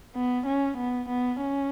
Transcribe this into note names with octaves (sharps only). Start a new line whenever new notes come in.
B3
C#4
B3
B3
C#4